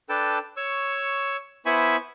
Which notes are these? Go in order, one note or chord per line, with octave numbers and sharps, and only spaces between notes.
D4 A4 B4 G5 A5
C#5 C#6 E6
B3 E4 C5 G#5 B5 C#6